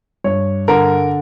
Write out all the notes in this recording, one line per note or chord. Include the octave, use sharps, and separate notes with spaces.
G2 C#5
D3 A#4